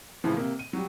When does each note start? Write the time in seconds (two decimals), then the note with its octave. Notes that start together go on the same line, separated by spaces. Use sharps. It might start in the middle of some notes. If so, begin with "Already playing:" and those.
0.24 A2 C#3 E3 F3
0.37 C3 A#3
0.59 D#7
0.73 F#3 G3